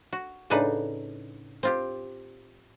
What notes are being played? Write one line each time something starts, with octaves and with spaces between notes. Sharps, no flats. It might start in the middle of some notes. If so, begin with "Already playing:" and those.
F#4
A2 C#3 D4 D#4 B4
C4 F4 G4